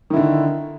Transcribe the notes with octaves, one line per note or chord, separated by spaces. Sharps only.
D3 D#3 E4